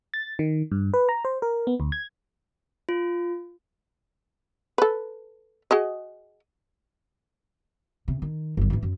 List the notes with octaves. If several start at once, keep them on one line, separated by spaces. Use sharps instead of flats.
A6
D#3
G2
B4
A#5
C5
A#4
B3
D2
G#6
F4
A4 B4
F#4 G#4 D#5
C3
D#3
G1 F#3
G#2 E3
F#2